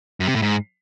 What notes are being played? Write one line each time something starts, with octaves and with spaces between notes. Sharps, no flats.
F#2
C3
A2
G#2